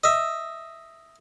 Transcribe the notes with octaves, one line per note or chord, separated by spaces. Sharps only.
D#5 E5